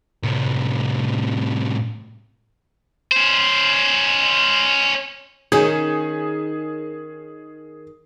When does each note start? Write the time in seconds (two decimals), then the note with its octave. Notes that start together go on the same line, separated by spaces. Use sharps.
0.23 A2 C3
3.12 C#4 C5
5.52 D#3 C#4 G#4